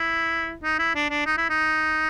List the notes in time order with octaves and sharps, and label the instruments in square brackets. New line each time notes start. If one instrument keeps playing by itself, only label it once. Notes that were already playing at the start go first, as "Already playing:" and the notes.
Already playing: [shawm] E4
D#4
E4
D4
D4
D#4
E4
D#4